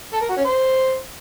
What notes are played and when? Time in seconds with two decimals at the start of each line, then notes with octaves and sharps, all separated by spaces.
0.13 A4
0.21 A#4
0.29 F#4
0.37 C#4
0.45 C5